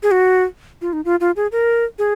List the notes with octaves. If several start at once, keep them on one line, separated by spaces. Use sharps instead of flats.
G#4
F#4
F4
D#4
F4
F4
G#4
A#4
G#4